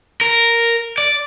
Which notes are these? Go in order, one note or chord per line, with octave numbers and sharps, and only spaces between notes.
A#4
D5